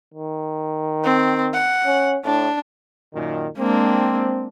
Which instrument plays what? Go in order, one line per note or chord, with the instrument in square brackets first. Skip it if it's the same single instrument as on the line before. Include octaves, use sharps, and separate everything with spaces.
[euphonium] D#3
[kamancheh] C4
F#5
[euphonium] C#4
[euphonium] A2 [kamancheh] D4
[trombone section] F#2 A#2 D#3
[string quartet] G#3 D4 [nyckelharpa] A#3 [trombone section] C4